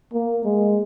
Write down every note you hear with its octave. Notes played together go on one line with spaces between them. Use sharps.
A#3
G#3